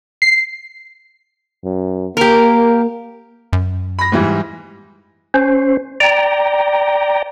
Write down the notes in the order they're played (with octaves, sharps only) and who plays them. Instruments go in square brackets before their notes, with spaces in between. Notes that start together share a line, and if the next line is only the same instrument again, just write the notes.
[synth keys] C7
[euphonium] F#2
[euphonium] A#3 [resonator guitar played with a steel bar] G4 A#4
[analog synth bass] F#2
[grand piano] B5 A#6
G#2 E3 G3
[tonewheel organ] C#4 C5
D5 G5 A#5